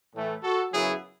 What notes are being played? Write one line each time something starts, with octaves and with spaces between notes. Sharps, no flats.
A2 E3 A3
F#4 A4
F#2 C#3 F#3 B3 E4 G#4